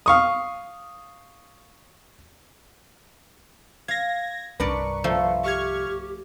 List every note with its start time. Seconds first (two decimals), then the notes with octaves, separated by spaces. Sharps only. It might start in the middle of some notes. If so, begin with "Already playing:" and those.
0.06 F5 C#6 D#6
3.88 F5 G#6 A#6
4.60 C2 G2 D4 A#4 B4 D5 C#6
5.04 F3 A3
5.44 G4 C#6 F6 G#6